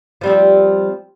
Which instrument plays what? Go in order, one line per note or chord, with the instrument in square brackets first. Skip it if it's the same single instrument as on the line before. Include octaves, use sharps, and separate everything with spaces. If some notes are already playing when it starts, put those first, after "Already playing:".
[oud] F3 G3 C4